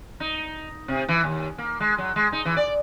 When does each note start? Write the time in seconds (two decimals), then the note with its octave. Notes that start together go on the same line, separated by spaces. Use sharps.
0.20 D#4
0.88 C3
1.09 E3
1.24 D#2
1.58 A#3
1.80 G#3
1.98 F#3
2.16 G#3
2.32 D#4
2.45 E3
2.57 D5